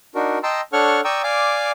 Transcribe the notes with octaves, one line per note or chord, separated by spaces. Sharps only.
D4 D#4 F#4 A#4
D#5 G5 A5 A#5 C6 E6
D4 A4 C#5 F#5 C#6 F6
D5 G5 A#5 C#6 D#6 E6
D5 F5 G#5 D6